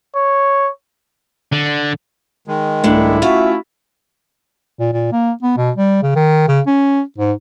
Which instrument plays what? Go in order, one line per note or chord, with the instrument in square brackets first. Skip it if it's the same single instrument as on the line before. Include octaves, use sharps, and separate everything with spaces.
[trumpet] C#5
[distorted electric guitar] D3
[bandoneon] D#3 G#3
[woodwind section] C2 G#2 [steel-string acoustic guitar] A3 D4 [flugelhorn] E4
[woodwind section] A3 C#4 F#4 [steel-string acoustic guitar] F4 E5
[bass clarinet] A#2
A#2
A#3
B3
B2
G3
C#3
D#3
C#3
C#4
G#2